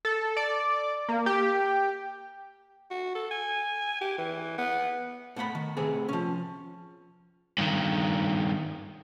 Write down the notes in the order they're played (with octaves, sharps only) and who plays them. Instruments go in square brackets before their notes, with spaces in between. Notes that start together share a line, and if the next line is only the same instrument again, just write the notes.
[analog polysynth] A4
D5
A#3
G4
[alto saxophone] F#4
A4
G#5
G4
E3
B3
[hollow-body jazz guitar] A2 B3 F#5 B5
D#3
A2 C3 B3 C4 G#4
F3 C#4
[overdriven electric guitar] G2 D#3